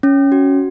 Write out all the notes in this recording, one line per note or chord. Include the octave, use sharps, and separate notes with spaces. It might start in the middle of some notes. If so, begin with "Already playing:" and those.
C#4
F#4